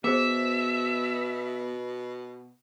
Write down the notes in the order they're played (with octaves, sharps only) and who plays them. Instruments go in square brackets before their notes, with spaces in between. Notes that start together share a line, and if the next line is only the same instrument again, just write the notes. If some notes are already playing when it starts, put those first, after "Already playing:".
[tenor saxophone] B2 [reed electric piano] B3 [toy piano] G#4 C5 [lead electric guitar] E5